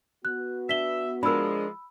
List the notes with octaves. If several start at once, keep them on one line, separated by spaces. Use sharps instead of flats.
B3 F#4 F#6
D4 E5 B6 G7
F3 G#3 D4 A#4 B5 E6